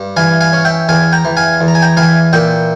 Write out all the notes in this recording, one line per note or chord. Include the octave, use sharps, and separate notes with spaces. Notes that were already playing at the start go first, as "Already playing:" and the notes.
Already playing: G2
E3 F5 G#5
F5 G#5
C#4
E5 G5
E2 F5 G#5
G5 A#5
E3
F5 G#5
E2
A#5
G#5
G5 A#5
E3 F5 G#5
A#2 E5 G5